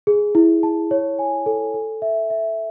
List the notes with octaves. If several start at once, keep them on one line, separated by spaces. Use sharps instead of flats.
G#4
E4
A5
C#5
G#5
A4
A4
E5
E5